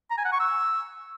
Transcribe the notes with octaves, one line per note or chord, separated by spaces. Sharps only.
A#5
G#5
F#5
C#6
E6